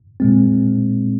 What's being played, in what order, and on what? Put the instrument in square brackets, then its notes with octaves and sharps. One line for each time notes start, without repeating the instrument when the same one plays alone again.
[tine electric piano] A#2 G#3 C4